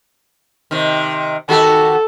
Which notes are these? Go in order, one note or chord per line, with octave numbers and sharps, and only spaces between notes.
C3 D#3
D#3 F#4 G4 A4